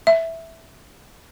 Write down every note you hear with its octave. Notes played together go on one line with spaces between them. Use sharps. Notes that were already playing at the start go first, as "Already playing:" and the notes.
E5